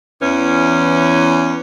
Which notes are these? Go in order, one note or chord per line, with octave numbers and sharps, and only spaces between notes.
E2 E3 C#4